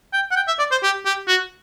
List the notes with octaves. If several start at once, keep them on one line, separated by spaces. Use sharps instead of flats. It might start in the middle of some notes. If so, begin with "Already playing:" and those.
G5
F#5
G5
E5
D5
C5
G4
G4
F#4